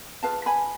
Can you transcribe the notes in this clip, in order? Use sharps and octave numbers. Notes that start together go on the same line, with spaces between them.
F4 G#4 B4 F5 A5
G#5 B5